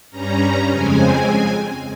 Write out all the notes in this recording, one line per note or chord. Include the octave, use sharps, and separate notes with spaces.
G2 G3 C#4 A#5
F2 C#3 G#3 C4 G#5